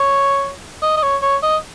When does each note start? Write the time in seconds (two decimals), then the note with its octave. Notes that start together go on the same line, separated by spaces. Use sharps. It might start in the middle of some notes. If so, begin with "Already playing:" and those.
Already playing: C#5
0.83 D#5
0.97 D#5
1.03 C#5
1.22 C#5
1.43 D#5